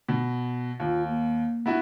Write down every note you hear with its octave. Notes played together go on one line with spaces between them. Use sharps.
B2
D#2 F4
A#3
B3 E4 F#4